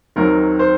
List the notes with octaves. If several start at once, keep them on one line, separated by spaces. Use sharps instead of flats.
D#2 D#3 F#3 C4 A#4
C5